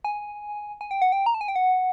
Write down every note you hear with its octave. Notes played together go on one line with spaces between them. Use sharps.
G#5
G#5
G5
F#5
G5
A#5
A5
G#5
G5
F#5